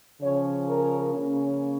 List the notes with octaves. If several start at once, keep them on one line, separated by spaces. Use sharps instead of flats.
C#3 F3 C#4 C#5
A#4
C#3 A#3 C#4